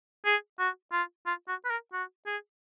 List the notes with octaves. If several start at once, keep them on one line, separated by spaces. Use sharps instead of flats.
G#4
F#4
F4
F4
F#4
B4
A#4
F#4
G#4